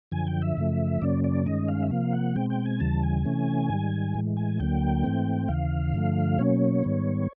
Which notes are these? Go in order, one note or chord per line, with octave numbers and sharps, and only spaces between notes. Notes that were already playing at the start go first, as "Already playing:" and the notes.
F#2 D3 F3 G#5
G5
E5
F#2 C#3 F3 A3
F#2 C#3 F#3 A#3 C#4 D5
D5
G2 D#3 G#3 C#4 D#5
F5
E5
C3 F3 A#3 F5
F#5
B2 G#3 C4 G5
G5
G#5
D#2 C#3 E3 G3 A5
G#5
C3 E3 A3 C#4
G#2 D#3 G3
A2 E3 G#3
G#5
D2 D3 F#3 A#3 G5
G#2 E3 A3 C4
D#2 C#3 E3 F5
G2 D3 F3 A3
B2 F#3 A#3 C#4 C#5
G#2 D#3 G3 B3